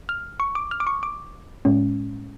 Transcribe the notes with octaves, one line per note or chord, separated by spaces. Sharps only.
F6
C#6
D6
F6
D6
C#6
D6
A2 G#3 C#4